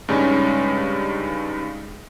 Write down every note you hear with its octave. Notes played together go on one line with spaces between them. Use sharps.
G2 C#3 G3 G#3 C#4 D#4